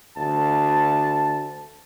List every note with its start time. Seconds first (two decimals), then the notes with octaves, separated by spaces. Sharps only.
0.17 D2 A5